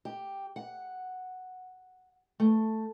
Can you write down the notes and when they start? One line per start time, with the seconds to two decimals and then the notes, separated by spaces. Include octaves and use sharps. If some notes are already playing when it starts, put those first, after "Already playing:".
0.05 G4
0.56 F#5
2.40 A3